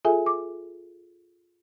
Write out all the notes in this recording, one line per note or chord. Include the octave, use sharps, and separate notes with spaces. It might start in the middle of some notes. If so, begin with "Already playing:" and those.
F4 G#4 A4 E5 G#5
D6